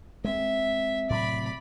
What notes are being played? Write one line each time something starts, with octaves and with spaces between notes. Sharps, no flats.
G#3 C4 E5
A2 C3 F#3 D5 B5